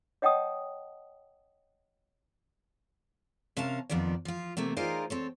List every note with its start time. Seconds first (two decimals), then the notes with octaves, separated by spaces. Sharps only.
0.22 C#5 D#5 F#5 G5 A5 D#6
3.57 C3 C#4 A#4 F5 A5
3.90 F2 D#3 F3 B3 D5
4.25 F3 F4
4.57 C3 A3 A#3 C4
4.77 D#4 F4 G#4 A#4 C5 D5
5.10 C4 A4 C#5